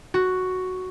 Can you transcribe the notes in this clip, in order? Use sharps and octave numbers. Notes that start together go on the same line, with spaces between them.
F#4